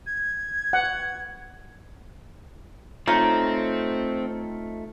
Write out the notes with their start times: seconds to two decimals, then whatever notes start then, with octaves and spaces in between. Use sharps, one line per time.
0.07 G#6
0.73 F#5
3.08 A3 C4 D#4 F4 C#5